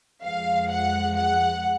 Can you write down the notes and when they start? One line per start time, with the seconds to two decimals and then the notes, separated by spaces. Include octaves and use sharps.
0.24 F2 F3 G#3 F5
0.71 F#5
1.17 F#5